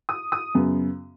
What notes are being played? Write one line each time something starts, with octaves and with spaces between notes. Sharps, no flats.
D#6
D#6
F#2 C#3 B3